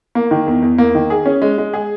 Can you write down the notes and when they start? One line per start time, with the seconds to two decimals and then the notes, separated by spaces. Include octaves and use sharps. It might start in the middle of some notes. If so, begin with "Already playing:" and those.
0.15 A#3
0.31 D#3
0.46 E2
0.62 E2
0.78 A#3
0.95 D#3
1.10 G#4
1.25 C#4
1.42 G#3
1.58 G#3
1.74 G#4